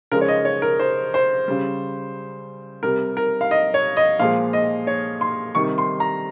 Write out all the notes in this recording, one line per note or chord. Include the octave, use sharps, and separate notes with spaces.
C#3 F3 G#3 A#4
C#5
D#5
C#5
A#4
C5
C5
C#3 G3
C3 G3 A#4
A#4
F5
D#5
C#5
D#5
A#2 F3 G#3 F5
D#5
C#5
C6
C3 D#3 G3 C#6
C6
A#5